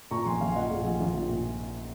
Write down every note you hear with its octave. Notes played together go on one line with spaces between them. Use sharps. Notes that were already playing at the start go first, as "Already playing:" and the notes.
A#2 A#5 C#6
A#1 G#5 C6
A#1 F5 G#5
A#2 D#5 F#5
A#2 F4 G#4
A#1
A#1 F4
A#2
A#2